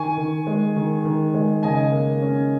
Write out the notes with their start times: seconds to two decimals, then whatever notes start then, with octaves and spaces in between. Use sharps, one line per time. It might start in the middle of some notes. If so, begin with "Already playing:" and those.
Already playing: D#3 G#5 C#6
0.18 D#3
0.47 G#3
0.76 D#3
1.05 D#3
1.35 G#3
1.63 C#3 D#5 G#5
1.92 A#3
2.22 C#4